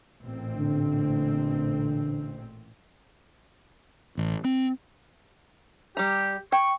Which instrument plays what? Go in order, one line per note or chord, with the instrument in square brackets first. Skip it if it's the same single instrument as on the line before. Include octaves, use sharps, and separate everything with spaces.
[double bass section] A1 A#2 C4
[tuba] D3
[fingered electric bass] A1
C4
[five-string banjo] G3 A#5 [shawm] G4
[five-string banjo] G5 [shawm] C#6